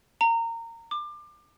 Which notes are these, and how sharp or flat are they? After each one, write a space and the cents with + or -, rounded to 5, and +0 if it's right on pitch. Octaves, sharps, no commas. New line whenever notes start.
A#5 -25
D6 +25